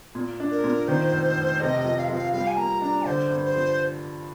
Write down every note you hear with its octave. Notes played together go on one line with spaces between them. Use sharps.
A#2
D4
A#4
A#2
D#3 C5
F1
F1
C3 D#5
F3
F5
D#5
F3 F5
G3 F5
G#5
A#3 A#5
D4 A#5
D3 C5
G2
C5
F3